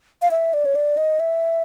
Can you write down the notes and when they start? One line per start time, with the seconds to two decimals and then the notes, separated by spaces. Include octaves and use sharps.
0.22 F5
0.31 E5
0.54 D5
0.65 C#5
0.75 D5
0.97 D#5
1.20 E5